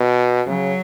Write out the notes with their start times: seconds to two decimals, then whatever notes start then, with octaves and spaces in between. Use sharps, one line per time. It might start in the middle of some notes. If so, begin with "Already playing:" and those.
Already playing: B2
0.47 C#3 F#3